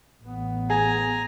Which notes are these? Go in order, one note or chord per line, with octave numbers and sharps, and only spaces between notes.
A1 B3
G#4 G#5 A#5